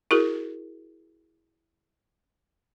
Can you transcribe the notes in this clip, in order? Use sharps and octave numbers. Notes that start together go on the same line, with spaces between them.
E4 F#4 G#4 A#4